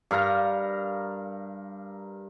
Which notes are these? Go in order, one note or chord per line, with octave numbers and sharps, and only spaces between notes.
G2 A#4 F5 A#5